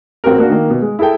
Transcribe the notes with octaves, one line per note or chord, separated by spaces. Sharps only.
A1 C4 F#4 A#4
A#3 D4 F#4
D#3 A#3
B2
G#3
E4 G#4 A4 G5